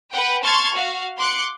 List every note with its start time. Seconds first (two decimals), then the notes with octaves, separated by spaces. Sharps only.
0.11 B4 F#5 G5
0.43 A5 C6 C#6 F6 G#6 A6
0.74 F#4 F5
1.17 C6 D6 F#6 C#7